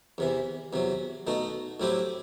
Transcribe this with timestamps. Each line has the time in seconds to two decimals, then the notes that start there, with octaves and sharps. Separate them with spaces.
0.18 E2 C3 E3
0.73 E2 C3 F#3
1.27 B2 A3 D#4 F#4
1.80 A2 F#3 C4 E4 G4